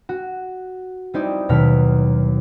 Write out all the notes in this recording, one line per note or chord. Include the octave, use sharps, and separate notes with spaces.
F#4
G3 C4 D#4 E4 D5
D#2 B2 F#3 F6 B6